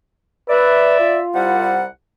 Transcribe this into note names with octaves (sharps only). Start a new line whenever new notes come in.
B4 D5 E5
F4
C2 G3 F#5